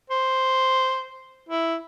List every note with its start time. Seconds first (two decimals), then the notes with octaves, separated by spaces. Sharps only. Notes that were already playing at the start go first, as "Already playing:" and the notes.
0.10 C5
1.49 E4